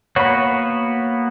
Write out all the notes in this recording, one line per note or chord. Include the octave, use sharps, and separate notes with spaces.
A#3 B3 F#4 C#5 B5